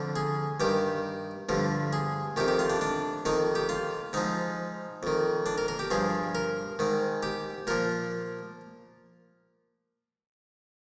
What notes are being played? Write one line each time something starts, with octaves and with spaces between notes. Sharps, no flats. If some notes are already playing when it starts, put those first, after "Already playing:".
Already playing: F2 D3 F3
G#4
G2 D#3 G4
G2 D3 F3
G#4
F2 C3 D#3 G4
G4
F4
D4
D4
F2 D#3 D#4
G4
F4
G#2 F3 D#4
F2 D#3
D4
A#4
A#4
G4
G2 F3 G#4
A#4
G#2 D#3
G4
A#2 F3 A#4